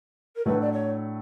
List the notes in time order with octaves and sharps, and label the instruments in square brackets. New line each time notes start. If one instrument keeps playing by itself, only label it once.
[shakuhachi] A#4
[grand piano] A2 F#3 A3 D4 [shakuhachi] B4
[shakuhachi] D5
C#5